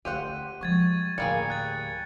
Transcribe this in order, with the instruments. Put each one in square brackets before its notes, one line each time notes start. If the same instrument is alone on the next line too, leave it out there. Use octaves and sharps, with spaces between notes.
[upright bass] D2 [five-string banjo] G4 C5 F#5 [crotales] D#7
[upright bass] F3 G#3 [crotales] C#6 G#6 A6
[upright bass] D2 A2 [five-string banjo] G3 A#3 G#4 [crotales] C#7
[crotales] F#6 G#6 A6